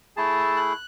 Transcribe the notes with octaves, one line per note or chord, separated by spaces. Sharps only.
A3 E4 G#4 A5
F#6